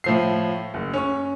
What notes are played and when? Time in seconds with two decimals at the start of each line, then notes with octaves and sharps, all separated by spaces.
0.04 A2 F3 C7
0.74 F#1
0.94 C#4 C#6